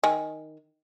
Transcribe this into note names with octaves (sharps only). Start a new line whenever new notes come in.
D#3 G#5